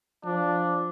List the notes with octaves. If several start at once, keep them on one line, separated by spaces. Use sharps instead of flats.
F3 D4